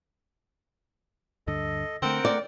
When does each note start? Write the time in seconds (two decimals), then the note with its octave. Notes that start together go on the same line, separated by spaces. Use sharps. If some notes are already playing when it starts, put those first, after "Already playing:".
1.47 D2 G2 D3 A4 D#5
2.02 D3 A3 C4 A#4 F#5 G5
2.25 A3 D5